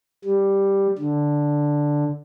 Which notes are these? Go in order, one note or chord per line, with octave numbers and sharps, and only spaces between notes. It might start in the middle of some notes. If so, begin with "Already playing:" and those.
G3
D3